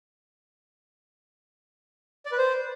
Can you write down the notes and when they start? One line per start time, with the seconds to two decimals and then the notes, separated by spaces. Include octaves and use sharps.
2.26 D5
2.32 B4
2.38 C5